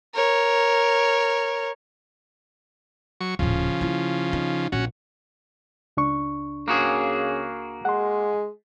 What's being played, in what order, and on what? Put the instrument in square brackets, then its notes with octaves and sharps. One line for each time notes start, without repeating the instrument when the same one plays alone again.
[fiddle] A#4 C#5
[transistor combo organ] F#3 C#6
[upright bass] D#1 A2 [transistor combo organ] C#3 F3
[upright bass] A#3 E4
D#4
[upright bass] A#1 [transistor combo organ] C#4 F#4
[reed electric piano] C#2 D4 C#6
[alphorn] C#3 [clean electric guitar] A#3 F#4 G#4
[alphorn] G#3 [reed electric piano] F#5 C6